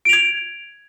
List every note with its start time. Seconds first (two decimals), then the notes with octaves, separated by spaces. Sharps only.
0.05 D7
0.09 F7
0.13 G#6